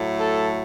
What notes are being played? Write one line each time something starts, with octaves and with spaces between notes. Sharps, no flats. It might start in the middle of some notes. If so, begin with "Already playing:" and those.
Already playing: A2 F#3 A3
A4